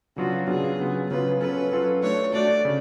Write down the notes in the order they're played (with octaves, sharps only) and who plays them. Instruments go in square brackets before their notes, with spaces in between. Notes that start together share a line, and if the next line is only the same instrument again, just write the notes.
[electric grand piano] C#3 F#3 B3 D4 F4 [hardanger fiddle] F#4
[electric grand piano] C#3 F#3 B3 D4 F4 [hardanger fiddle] G#4
[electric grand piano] C#3 F#3 B3 F4
[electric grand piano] C#3 F#3 B3 F4 [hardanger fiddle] B4
[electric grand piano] F#3 C#4 F4 A4 [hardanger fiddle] B4
[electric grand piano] F#3 C#4 F4 A4
[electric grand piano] A3 D4 F#4 [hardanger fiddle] C#5
[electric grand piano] A3 D4 F#4 [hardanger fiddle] D5
[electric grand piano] C#3